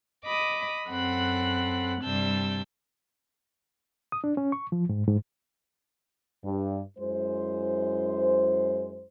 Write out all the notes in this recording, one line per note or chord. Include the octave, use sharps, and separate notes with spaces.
D#5 B5 D6 D#6
F#2 C4 A4 F#5 B5 F#6
G2 C3 G3 A5 E6 G6
D#6
D4
C#4
C#6
F3
G#2
G#2
G2
F#2 G#3 E4 C5